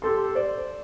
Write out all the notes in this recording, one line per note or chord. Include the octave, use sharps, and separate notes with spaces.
G4 A4 C6
C5 D5